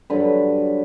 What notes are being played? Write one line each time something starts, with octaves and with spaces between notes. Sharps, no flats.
G2 D3 F#3 B4